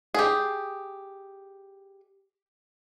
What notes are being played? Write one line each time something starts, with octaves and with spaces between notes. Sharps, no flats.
G4 G#4